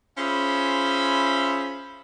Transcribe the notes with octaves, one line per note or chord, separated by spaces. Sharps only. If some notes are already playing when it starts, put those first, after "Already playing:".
C#4 F4 G#4 C5 E5 B5